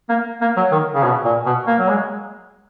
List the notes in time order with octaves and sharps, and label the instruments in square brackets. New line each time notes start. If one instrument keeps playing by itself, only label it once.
[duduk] A#3
A#3
F#3
D#3
C#3
B2
A#2
B2
A#3
F#3
G#3